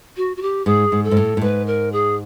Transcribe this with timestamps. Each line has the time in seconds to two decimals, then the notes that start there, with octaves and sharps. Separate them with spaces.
0.17 F#4
0.36 F#4
0.42 G4
0.66 G#2 G#4
0.92 G#2
1.04 A4
1.11 G#2
1.17 A2
1.37 A2
1.41 G#2 B4
1.66 A#4
1.92 G#4